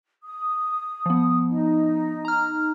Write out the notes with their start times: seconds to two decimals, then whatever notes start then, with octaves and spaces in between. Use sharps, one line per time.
0.24 D#6
1.06 F3 B3
1.48 D#4
2.25 A#5 F6